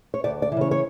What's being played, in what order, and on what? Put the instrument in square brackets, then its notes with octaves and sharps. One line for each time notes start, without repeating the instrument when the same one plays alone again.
[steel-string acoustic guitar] C#5
D2 D5
D5
E3
C#3 C#5
C#5